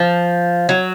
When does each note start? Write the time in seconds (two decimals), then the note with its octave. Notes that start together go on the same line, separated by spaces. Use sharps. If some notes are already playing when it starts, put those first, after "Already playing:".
Already playing: F3
0.69 F#3